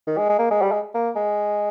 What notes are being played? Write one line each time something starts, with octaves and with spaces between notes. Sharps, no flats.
D#3
G#3
G#3
A#3
G#3
G3
G#3
A#3
G#3